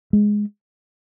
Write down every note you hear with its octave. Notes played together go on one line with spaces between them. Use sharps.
G#3